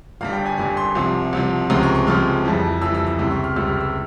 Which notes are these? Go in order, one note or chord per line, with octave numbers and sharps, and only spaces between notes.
G1 G2 G3 F5
G5
G#5
G1 G2 G3 G#5
C6
C2 C3 F3
C2 C3 F3
C#2 C3 F3 G#3 A#5
C#6
C#6
C#2 C3 F3 G#3 F6
F2 E3 G3
F2 E3 G3 E6
E6
E6
C#2 C3 G3 E6
C#6
F6
C#2 C3 G3 E6
F6
E6